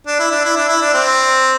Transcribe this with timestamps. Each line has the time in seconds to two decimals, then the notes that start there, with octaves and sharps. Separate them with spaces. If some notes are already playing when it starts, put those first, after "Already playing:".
0.07 D4
0.19 E4
0.31 D4
0.45 E4
0.57 D4
0.68 E4
0.81 D4
0.94 C4